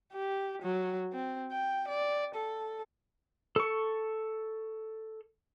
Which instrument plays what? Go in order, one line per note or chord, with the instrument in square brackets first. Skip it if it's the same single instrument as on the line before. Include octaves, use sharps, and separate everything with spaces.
[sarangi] G4
F#3
C4
G5
D5
A4
[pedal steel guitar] A4 C#6